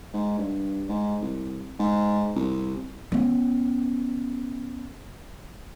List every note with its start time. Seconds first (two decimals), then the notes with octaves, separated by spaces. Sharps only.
0.13 G#2
0.38 G2
0.89 G#2
1.22 C2
1.79 G#2
2.36 C2
3.12 B3 C#4